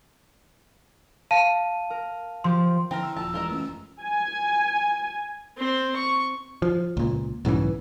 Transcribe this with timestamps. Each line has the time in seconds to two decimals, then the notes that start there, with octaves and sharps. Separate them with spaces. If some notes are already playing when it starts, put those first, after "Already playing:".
1.31 F5 A5 D#7
1.90 A#4
2.44 F3 G4 C6
2.91 D3 C4 E4 A#5 F6
3.03 E6
3.16 D#1 A#1 F3 A5 E6
3.34 E3 G#3 F4 A#4 D#5
3.49 F#1 A3 C#4
4.02 G#5
5.57 C4 C5
5.96 C#6
6.62 F3
6.97 C#2 A#2
7.45 B1 G#2 C#3 E3